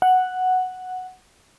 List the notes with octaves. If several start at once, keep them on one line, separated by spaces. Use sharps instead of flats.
F#5